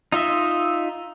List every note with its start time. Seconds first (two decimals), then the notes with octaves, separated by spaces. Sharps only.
0.12 D#4 F4 D#5 E5